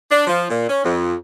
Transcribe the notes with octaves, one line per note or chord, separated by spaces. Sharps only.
D4
F3
A#2
C#4
F2